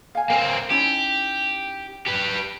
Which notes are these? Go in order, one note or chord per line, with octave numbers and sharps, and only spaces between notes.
F5 G#5
A#3 C4 A#4 G5
C#4 D#4 E4 G4
G4 B4